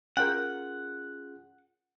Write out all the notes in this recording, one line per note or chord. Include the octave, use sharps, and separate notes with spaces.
C#4 F4 G#4 A#4 F#5 G5